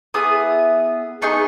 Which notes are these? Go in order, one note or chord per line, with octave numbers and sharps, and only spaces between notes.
B3 E4 G#4 D#6
B3 D#4 G#4 C#6